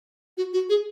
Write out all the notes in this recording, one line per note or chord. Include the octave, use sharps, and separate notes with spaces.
F#4
F#4
G#4